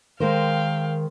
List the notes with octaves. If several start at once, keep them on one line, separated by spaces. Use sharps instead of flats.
D#3 G#3 A#4 C5 F5 G5